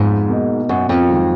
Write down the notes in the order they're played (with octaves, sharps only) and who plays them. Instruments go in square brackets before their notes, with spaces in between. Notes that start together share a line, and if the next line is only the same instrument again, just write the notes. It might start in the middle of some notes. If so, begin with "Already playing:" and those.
Already playing: [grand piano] F2 F3 B3 F4 [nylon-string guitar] G#2
[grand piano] B2 A#3 D#4
[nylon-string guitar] F#2
F2
[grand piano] G#2 D#3 F#3